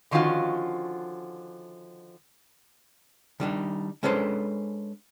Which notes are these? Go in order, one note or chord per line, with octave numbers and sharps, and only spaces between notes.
D3 D#3 F3 C#4 F4 F#4
D#3 G3 D4 D#4
G#3 C#4 D4 A4 B4 C5